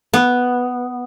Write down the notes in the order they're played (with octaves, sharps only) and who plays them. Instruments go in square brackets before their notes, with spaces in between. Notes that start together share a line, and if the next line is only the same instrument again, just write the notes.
[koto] B3